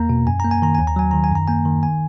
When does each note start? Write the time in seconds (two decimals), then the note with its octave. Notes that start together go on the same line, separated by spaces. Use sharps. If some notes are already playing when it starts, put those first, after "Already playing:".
Already playing: E2 A#3 A#5
0.10 B2
0.27 F#2 G#5
0.40 A#3 A#5
0.51 G#5
0.62 D#3 A#5
0.75 D#2 G#5
0.87 A#5
0.96 F#3 G#5
1.11 D#3 A#5
1.24 G#5
1.31 F#2 A#5
1.48 A#3 G#5
1.65 D#3
1.83 G#5